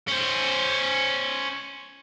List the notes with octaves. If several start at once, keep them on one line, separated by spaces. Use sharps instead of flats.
C#4 C5